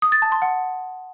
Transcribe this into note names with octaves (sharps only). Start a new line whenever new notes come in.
D#6
A6
A5
C6
F#5